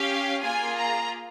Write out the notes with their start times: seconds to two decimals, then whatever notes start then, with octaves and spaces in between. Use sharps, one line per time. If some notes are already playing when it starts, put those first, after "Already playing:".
Already playing: C#4 G4 F5
0.41 A#3 F4 G#4 G#5
0.76 A#5